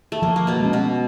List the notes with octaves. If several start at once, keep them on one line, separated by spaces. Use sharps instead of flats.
A3
F3 A#3
A#3
B2 B3
G#3 C#4
B2 B3